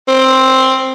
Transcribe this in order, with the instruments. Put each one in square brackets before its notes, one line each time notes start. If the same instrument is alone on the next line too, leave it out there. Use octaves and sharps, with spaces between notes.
[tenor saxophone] C4